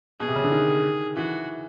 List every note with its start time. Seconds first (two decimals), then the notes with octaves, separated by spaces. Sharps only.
0.20 B2 G#4
0.28 C3
0.36 C#3
0.44 D3
0.52 D#3
1.16 E3 F#4